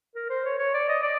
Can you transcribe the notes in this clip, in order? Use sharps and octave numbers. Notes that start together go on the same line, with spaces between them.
A#4
C5
C#5
C#5
D5
D#5
D5